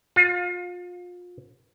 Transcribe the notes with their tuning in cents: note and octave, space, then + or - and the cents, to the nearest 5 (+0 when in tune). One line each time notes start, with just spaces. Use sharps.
F4 +30